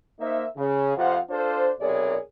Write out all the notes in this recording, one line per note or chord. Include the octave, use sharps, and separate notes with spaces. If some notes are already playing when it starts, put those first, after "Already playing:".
A#3 D#4 C5 E5
C#3
F2 C3 F4 C5 F5 F#5
D4 F4 A4 C5
B1 C3 G#4 A#4 C#5 D5